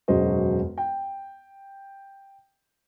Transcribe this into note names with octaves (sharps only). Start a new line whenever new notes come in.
E1 F#2 C#3 F#4 C5 D#5
G5